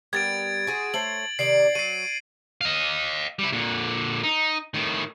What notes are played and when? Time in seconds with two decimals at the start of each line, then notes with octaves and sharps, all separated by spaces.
0.13 G3 B3 A#4 G#6 A6 D7
0.67 F#4 G#4 C5
0.94 A3 C5 C#5 F#7
1.39 C3 D#3 D5 C7 D7 F#7
1.75 F#3 C7 D#7
2.61 D#5 F5
3.39 G3 E4
3.52 A#2 D3
4.23 D#4
4.74 A2 D#3